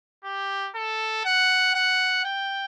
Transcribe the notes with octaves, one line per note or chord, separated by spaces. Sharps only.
G4
A4
F#5
F#5
G5